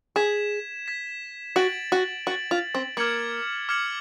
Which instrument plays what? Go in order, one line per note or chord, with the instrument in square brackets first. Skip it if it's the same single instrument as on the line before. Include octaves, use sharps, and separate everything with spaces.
[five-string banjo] G#4 [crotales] G#6 B6 E7
[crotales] G#6 B6 E7
[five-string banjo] F#4 [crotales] A6 D7 F#7
[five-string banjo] F#4
[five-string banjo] F#4 [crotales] A6 D7 F#7
[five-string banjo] F4
C4
[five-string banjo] A#3 [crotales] D6 F6 G#6 C#7 F#7
[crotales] D6 F6 G#6 C#7 F#7